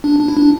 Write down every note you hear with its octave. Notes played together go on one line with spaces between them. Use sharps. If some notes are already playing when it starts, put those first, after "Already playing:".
D4
D4
E4
D4